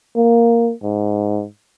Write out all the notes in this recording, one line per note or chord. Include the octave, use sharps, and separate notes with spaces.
A#3
G#2